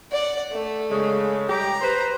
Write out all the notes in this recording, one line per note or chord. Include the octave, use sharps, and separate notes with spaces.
D5 F#5
A3
C#3 G#3
G3 G4 A#5
B4 C5